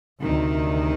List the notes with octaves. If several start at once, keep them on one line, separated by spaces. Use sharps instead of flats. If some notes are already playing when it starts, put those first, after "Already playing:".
D2 C3 D#3